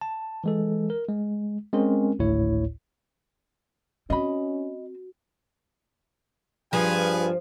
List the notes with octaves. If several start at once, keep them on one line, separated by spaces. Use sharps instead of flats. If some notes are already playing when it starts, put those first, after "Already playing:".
A5
E3 G#3 A4
A#4
G#3
G#3 C4 C#4 A#4
G#1 D2 A2 E4 C#5
C4 C#4 F#4 D#5 B5
G2 F3 G#4 B4 G#5